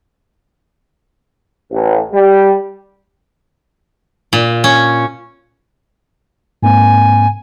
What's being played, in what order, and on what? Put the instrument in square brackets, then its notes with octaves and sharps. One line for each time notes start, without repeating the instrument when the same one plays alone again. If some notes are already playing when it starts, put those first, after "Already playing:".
[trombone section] A1
G3
[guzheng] A#2
C#4
[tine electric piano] G#2 A#3 C4 [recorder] G#5